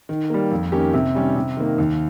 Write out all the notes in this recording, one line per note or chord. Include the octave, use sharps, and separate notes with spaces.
D#3
G3 A#3
F2
D#3 A#3 C#4 G4
C3
D#3 G3 C#4
C3
D#3 A#3
D#2